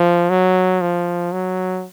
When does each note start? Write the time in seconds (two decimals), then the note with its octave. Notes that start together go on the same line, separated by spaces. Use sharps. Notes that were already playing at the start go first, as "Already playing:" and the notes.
Already playing: F3
0.30 F#3
0.81 F3
1.32 F#3